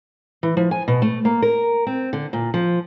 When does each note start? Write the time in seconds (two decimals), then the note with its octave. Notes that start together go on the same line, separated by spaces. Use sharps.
0.43 E3
0.57 F3
0.71 G#5
0.88 B2
1.02 A3
1.25 A#3
1.42 A#4
1.87 C4
2.13 D3
2.33 A#2
2.54 F3